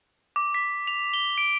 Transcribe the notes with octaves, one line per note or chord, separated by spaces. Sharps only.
D6
B6
F7
G7
D7